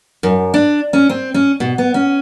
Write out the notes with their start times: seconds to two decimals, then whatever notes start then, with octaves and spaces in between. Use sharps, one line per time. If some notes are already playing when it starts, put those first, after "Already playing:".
0.23 F#2
0.54 D4
0.93 C#4
1.09 C4
1.34 C#4
1.60 B2
1.78 B3
1.94 C#4